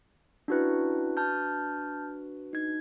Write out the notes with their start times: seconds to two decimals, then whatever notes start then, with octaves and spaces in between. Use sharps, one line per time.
0.48 C#4 D4 E4 F#4 B4
1.17 A5 F6 G6
2.53 D#4 G#6